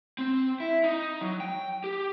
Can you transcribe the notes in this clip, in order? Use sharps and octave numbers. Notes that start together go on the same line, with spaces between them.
C4
E4
D#4
F#3
G5
G4